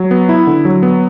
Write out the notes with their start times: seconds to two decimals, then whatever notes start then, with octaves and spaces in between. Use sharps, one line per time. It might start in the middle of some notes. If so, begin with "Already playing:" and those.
Already playing: F#3
0.11 B3
0.29 E4
0.47 D3
0.65 F#3
0.83 B3